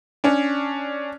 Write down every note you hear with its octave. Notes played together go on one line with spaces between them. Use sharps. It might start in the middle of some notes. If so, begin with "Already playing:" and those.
C#4 D4